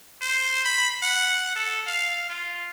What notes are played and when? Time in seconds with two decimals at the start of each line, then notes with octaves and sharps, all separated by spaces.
0.21 C5
0.65 B5
1.02 F#5
1.55 A4
1.87 F5
2.29 F4